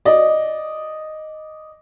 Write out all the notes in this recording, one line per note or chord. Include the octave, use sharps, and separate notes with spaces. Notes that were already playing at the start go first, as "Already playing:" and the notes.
D5 D#5